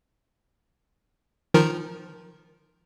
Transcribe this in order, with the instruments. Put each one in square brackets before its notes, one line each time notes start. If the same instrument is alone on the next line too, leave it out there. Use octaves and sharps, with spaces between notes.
[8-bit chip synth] D#3 F3 A#4